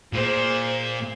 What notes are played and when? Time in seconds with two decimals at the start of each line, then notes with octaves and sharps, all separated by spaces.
0.13 A#2 G#4 C5